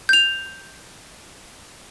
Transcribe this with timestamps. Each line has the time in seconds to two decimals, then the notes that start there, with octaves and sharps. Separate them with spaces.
0.09 G6 F7